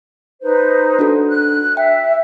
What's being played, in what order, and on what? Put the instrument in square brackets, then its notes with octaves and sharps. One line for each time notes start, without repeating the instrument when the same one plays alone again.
[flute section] D#4 B4 C5
[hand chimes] D4 F#4 A4
[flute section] F#6
[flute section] E5 [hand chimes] G5